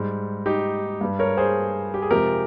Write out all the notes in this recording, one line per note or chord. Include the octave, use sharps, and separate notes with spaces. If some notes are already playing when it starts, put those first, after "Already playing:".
Already playing: G#2 G3
D#4 G4
G2 G3
A#4 C#5
G#4 C5
G4
G#4
F2 C3 F3 G#3 G4 A#4